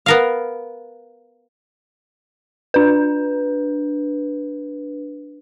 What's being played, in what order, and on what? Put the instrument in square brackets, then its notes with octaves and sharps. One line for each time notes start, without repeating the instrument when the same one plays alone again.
[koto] B3 A#4 F5
[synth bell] D4 B4